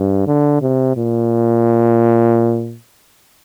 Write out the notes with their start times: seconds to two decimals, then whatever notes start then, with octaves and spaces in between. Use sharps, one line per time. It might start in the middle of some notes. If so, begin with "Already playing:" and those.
Already playing: G2
0.27 D3
0.62 C3
0.97 A#2